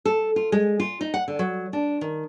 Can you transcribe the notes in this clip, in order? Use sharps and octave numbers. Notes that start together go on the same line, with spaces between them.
A4
F4
G#3
F4
D#4
F#5
D3
F#3
D4
D#3